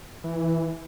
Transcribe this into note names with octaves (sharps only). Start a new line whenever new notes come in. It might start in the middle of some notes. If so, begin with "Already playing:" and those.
E3